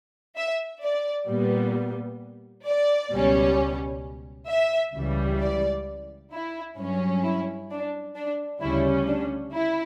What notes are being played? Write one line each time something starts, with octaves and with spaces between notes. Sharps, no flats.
E5
D5
A#2 G3 B3
D5
C#2 B2 G3 C#4
E5
C#2 C#3 E3 G3
D5
E4
G2 F#3 C#4
E4
D4
D4
D2 C#3 G3 C#4 E4
D4
E4